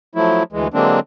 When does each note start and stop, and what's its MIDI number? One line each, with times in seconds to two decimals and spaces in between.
0.15 0.43 53
0.15 0.43 54
0.15 0.43 57
0.15 0.43 64
0.53 0.68 38
0.53 0.68 52
0.53 0.68 56
0.74 1.00 50
0.74 1.00 54
0.74 1.00 56
0.74 1.00 58
0.74 1.00 60
0.74 1.00 62